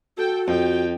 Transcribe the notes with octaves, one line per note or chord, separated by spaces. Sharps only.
F#4 A4 G5
F2 G5